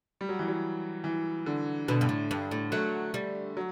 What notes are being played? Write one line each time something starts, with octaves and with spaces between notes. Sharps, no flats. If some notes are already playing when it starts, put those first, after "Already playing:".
G3
F#3
E3
F#3
E3
D3
B2 D3
G2
A2
G2
A2
F#3 A3
G3
F#3